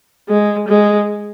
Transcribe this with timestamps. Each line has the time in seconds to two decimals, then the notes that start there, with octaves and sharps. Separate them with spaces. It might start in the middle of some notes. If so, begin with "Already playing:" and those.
0.29 G#3
0.68 G#3